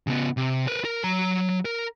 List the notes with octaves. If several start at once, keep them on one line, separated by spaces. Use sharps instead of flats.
C#3 B3
C3
A#4 B4
A#4
F#3 A#5
A#4